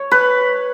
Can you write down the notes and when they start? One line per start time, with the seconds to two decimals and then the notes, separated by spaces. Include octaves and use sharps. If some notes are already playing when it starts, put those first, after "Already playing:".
Already playing: C#5
0.11 B4